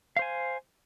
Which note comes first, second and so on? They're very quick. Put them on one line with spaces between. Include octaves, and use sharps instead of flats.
F5 C5 G#5